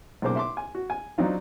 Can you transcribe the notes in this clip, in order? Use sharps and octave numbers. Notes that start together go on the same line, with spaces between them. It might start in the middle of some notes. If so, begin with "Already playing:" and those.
B1 A#2 C#3 C5 D6
E5 C6 D6
G#5
F#4
G#5
F#3 C4 D4 D#4 F4